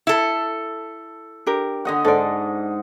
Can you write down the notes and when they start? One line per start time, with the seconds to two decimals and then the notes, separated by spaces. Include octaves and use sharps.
0.07 E4 A4
1.47 D4 G4 A#4
1.85 D3 D#5 F#5
2.05 G#2 A4 D5